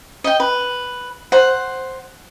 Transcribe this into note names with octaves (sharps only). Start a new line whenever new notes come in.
D#5 G5
B4
C5 F#5